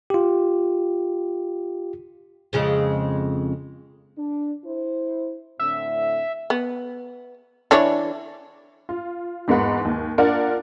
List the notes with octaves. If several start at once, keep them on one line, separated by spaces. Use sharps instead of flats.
F4 G4
F2 C#3 G#3
D4
E4 C5
A2 D3 C4 E5
B3
E3 D4 C#5
F4
E2 G#2 A#3 B3 F#5 B5
D#2
A#3 D4 F4 A#4 D5 F#5